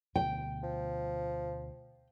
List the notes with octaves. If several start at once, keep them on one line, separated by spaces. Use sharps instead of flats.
D2 B2 G5
F3